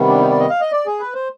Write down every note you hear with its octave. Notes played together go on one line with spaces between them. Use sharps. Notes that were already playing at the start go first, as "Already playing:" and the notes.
Already playing: C3 D#3 G3 B3
D4
D#4
D5
D#5
F5
D#5
D5
G#4
B4
C5